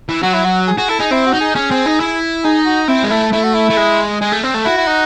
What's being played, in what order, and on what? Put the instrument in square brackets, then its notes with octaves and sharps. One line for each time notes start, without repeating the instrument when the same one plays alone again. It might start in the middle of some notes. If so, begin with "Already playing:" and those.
[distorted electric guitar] E3
[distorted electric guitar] F#3 [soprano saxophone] F#4
[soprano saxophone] E4
F#4
G#4
[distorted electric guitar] F#4 [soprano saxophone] G#4
[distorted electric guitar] E4 [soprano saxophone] A4
[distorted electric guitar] D#4 [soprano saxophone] G#4
[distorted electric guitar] C4 [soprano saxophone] E4
[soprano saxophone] F#4
[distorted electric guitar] D#4
[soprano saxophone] G#4
[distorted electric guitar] C#4 [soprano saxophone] G#4
[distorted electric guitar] C4
D#4
E4
[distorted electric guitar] D#4 [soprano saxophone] G#4
[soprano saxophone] F#4
[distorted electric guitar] C4 [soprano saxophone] E4
[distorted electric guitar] G#3
[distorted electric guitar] A3 [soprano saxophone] E4
[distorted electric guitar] A3 [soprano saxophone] E4
[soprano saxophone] F#4
E4
[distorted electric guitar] A3
G#3
[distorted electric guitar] G#3 [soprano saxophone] G#4
[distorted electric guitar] A3
C4
A3
[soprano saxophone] E4 [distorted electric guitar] F#4
[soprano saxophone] E4
D#4